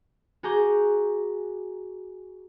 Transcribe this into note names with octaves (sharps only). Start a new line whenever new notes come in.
F#4 G#4 A#5 D6 G6